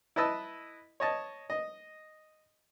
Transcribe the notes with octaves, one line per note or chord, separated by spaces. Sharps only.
E4 B4 D#5 A5 E6
C#5 D#5 A5
D#5